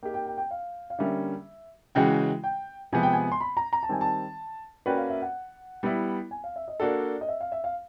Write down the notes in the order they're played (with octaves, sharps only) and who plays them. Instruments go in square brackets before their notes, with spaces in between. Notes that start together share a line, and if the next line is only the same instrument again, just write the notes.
[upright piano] A#3 D#4 G4 [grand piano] G5
[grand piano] G5
G5
G5
F5
F5
[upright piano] D3 G3 A#3 C#4 [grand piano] E5
[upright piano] C#3 E3 G#3 C#4 F#4 [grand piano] G5
[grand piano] G5
[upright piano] C3 F3 G#3 B3 [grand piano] G#5
[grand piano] G5
G#5
C6
B5
A#5
A#5
A5
[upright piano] D#3 G3 C4 [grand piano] G#5
[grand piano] A5
[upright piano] A#3 C#4 F#4 B4 D5 [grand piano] G5
[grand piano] F5
E5
F#5
[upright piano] G3 B3 E4
[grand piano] G#5
F5
E5
D#5
[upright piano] A#3 D4 F#4 A4 [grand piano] D5
[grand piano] D#5
E5
F5
E5
F5